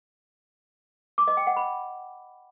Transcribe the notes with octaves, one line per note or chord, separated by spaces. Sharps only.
D6
D#5
G5
F#5
B5